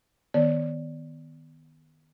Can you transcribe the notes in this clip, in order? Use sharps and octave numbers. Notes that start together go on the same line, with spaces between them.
D#3 B3 D5